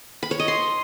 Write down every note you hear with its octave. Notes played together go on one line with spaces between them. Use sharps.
B5
C#5
D#5
C6